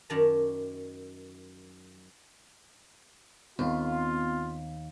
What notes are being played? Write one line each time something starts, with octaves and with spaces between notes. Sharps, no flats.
F#2 D#3 C#5 D5 A5 A#5
D#2 B3 C4 F4